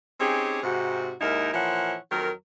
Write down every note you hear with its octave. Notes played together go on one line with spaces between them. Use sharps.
C4 C#4 D#4 G4 G#4
G#2 C3 F#4
D#2 G#2 D#4 E4 A#4
A#2 E3 F3 E4 C#5 F#5
F2 D#3 F#3 A#4